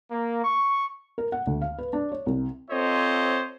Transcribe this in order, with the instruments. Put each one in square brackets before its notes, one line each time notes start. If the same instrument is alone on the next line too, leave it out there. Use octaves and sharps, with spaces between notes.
[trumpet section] A#3
C#6
[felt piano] A#4
F#5
D2
F5
B4
D4
C#5
C2
[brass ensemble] C4 F4 A4 C5 C#5 D#5